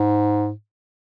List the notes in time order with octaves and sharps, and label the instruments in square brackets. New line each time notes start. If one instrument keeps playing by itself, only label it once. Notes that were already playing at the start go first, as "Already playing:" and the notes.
Already playing: [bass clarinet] G#2